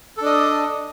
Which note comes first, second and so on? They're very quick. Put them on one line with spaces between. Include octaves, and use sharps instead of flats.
A4 D4 D#5